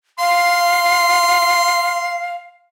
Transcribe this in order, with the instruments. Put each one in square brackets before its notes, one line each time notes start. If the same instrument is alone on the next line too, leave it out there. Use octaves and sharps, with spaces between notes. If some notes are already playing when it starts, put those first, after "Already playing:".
[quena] F5 [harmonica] C6